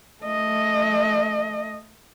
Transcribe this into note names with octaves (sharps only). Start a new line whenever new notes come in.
A3 D#5